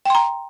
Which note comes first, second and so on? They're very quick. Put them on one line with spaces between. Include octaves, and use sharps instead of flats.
G5 C6 A#5